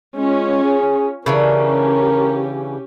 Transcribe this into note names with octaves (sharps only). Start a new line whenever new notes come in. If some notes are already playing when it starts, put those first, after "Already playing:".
G#3 C#4 F4
G#4
C#3 E3 C#4 D4 G4 A#4